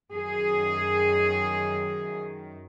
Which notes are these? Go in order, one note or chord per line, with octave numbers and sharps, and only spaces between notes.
F#2 D#3 G#4